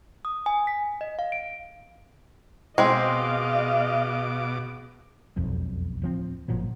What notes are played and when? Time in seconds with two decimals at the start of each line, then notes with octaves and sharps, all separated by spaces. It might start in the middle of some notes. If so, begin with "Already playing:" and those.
0.25 D#6
0.46 G#5
0.67 B6
1.01 D#5
1.19 F5
1.32 D7
2.78 B2 G#3 C4 C5 D#5 F5 D6
5.37 E1 B1 F2
6.02 D1 F3 C4
6.48 F#1 A#2 F3 F#3